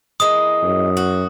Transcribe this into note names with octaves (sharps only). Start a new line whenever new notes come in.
E3 G#3 A#3 D#6
F#2
F#4